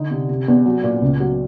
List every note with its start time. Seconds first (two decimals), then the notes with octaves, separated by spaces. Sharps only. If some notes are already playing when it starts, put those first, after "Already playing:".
Already playing: D3 D#4
0.11 C3
0.29 C3
0.48 E2
0.66 F#3
0.83 A#2
1.02 C#2
1.20 F#3